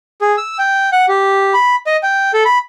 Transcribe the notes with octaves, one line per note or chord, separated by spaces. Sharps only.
G#4
E6
G5
F#5
G4
B5
D#5
G5
A4
B5